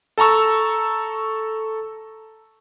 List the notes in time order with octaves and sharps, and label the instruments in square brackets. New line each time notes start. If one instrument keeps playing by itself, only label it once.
[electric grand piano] A4 A5 A#5 C#6 E6